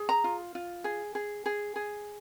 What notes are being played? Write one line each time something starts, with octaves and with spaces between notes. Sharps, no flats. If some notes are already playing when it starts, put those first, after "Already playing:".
Already playing: G#4
A#5
F4
F4
G#4
G#4
G#4
G#4